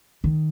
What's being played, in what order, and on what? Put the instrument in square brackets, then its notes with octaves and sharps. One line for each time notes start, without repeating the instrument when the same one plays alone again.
[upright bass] D#3